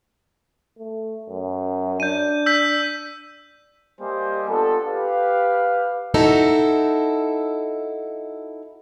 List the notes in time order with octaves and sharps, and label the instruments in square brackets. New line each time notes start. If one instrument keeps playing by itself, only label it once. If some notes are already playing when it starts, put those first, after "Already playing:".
[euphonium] A3
F#2
[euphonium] D4 [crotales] G6 D#7
[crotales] E6 G6 B6
[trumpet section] G3 A#3 G4 C5 D#5 G#5
B3 D4 F4 A4
G4 B4 F5
[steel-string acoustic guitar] D#4 E4 F#4 A4